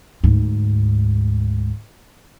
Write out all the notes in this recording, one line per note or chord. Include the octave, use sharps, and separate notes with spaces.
D2 G#2